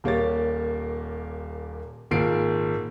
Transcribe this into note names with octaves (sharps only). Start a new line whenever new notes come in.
D#1 A#3 G4 C#5 A6
G#1 A#2 C7 D7